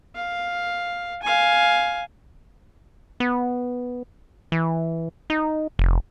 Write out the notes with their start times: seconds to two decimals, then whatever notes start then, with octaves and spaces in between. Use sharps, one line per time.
0.15 F5
1.23 F5 G#5
3.20 B3
4.52 E3
5.30 D#4
5.79 F1